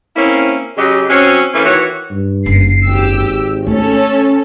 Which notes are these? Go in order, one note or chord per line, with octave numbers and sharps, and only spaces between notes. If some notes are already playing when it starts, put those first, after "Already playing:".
A#3 C4 C#4 E4 A#4
C#3 F#3 G4 D#5
F#3 C4 C#4
E3 A3 A#3 C#4
D#3 E3 F#4 C#5
G2
F#1 D#4 C7
G#1 G4 E6
A3 C#4 D4 A4